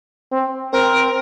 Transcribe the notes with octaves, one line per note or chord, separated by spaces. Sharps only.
C4
C4 A#4